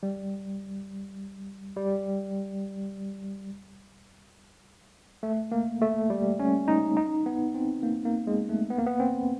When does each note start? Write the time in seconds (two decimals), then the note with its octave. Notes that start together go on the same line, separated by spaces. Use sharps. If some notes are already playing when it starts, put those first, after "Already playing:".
0.03 G3
1.76 G3
5.23 A3
5.52 A#3
5.82 A3
6.10 G3
6.39 C#4
6.68 D#4
6.97 D#4
7.26 B3
7.54 C4
7.83 A#3
8.05 A#3
8.27 G#3
8.49 A3
8.70 B3
8.78 A#3
8.86 B3
9.00 C4